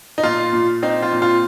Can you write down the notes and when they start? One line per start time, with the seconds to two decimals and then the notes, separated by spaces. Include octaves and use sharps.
0.18 D#4
0.23 A#2 F4
0.53 A#2
0.83 C4 D#4
1.02 F4
1.12 A#2
1.22 F4